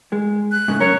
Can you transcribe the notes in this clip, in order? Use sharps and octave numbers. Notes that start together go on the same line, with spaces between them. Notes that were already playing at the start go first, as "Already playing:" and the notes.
G#3
F#6
G#2 C#3 A3
F#2 C#4 A#4 C#5